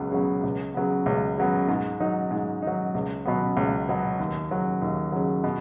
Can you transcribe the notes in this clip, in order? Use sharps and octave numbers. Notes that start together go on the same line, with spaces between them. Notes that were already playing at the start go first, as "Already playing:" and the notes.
Already playing: C#2 C#3 F#3 B3
C#3 F#3 B3
C#2
C#3 F#3 B3
C#2
C#3 F#3 B3
G#2
F#3 D#4
G#2
D#4
F#3
C#2
B2 F#3 B3
C#2
B2 F#3 B3
D#2
C#3 F#3
D#2
C#3 F#3
B2